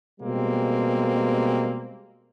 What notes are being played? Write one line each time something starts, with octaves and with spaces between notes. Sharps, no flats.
B2 G3 G#3 A#3 C4